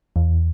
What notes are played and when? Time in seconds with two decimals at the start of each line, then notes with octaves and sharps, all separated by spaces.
0.16 E2